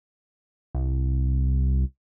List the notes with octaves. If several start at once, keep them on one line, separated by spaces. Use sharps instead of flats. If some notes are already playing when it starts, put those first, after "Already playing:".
C2